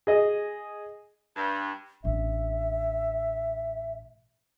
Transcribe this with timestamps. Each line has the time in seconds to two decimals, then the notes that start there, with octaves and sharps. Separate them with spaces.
0.07 G#4 D#5
1.36 G2
2.04 A1 D4 E5